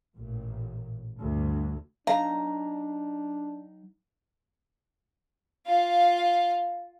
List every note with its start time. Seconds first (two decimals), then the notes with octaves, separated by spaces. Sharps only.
0.15 A1 A#2
1.19 D2 G2
2.07 F#3 D4 D#4 F5 A#5
5.67 F4 F5